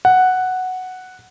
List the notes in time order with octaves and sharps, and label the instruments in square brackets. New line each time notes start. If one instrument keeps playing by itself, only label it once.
[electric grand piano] F#5